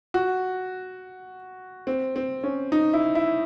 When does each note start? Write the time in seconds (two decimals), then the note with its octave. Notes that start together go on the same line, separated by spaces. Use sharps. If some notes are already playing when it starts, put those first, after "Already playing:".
0.14 F#4
1.87 C4
2.16 C4
2.44 C#4
2.72 D#4
2.93 E4
3.15 E4